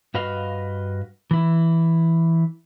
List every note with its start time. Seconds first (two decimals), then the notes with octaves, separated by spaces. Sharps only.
0.14 G2 F#4 B4 D#5 F5
1.31 E3 E4